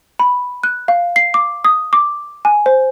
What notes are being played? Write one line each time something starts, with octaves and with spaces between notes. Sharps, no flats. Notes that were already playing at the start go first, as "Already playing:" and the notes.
B5
F#6
F5
C7
D6
D#6
D6
G#5
C5